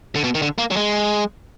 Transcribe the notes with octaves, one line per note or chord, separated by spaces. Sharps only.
D3
B2
D#3
D3
A#3
F#3
G#3